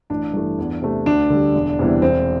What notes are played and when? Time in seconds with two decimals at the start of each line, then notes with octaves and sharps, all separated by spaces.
0.10 A1 D4
0.34 G2 E3 A3
0.58 E2
0.82 C3 A3
1.06 D2 D4
1.30 D3 G3
1.55 E1
1.79 E2 C3 E3 G3
2.02 E1 C4